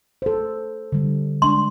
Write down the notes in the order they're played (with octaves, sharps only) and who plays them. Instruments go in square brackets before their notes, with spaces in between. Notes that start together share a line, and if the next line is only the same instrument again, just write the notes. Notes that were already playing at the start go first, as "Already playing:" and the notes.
[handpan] A4 C5
D3 G3
[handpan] G#3 D4 [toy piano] C6